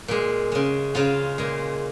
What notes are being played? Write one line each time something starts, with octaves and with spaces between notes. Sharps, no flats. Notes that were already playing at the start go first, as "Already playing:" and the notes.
A#2 G#3
C#3 G#3
C#3 G#3 F4
A#2 G#3